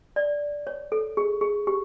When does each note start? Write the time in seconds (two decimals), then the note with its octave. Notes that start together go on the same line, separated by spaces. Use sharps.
0.16 D5
0.67 C#5
0.92 A4
1.17 G#4
1.41 G#4
1.67 G4